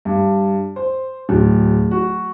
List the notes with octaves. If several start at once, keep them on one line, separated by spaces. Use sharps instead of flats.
G2
C5
D1
F#4